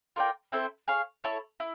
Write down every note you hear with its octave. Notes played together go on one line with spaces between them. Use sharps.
F4 A#4 D5 G5
C4 E4 A4 C5
G#4 C#5 F5
E4 A4 C#5
E4